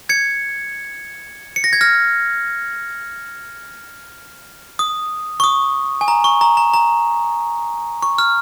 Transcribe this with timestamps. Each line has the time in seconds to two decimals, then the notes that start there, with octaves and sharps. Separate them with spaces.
0.09 G#6 C#7
1.56 C#7
1.64 A#6
1.73 G#6
1.81 F6 A#6
4.79 D#6
5.40 C#6
5.44 D#6
6.01 G#5
6.08 A#5
6.24 C#6
6.41 A#5
6.57 A#5
6.74 A#5
8.02 C#6
8.18 F6